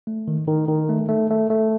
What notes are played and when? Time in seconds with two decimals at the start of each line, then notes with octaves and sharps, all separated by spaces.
0.07 A3
0.28 D#3
0.48 D#3
0.68 D#3
0.89 A3
1.09 A3
1.30 A3
1.50 A3